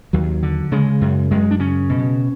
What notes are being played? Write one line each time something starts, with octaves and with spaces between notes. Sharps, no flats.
D#2 F#3
D3
C#3 G#3
F#2
F#2 G#3
D4
C#3 C#4
B2